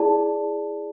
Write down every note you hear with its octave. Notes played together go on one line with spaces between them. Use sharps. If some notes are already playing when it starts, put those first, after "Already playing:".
Already playing: E4 G#4 D5 A5